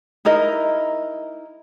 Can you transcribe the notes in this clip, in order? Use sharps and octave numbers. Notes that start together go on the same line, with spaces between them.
D#4 E4 A#4 D#5